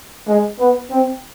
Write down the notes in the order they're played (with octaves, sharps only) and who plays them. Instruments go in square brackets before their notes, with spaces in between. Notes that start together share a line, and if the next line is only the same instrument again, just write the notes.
[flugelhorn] G#3
B3
C4